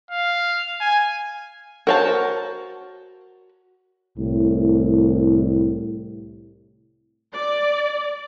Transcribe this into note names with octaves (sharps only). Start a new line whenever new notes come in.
F5
G#5
F#4 A#4 C5 C#5 A5
C2 A2
D5